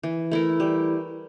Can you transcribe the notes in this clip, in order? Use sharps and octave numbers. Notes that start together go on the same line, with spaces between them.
E3
A3 E4 A#4
G3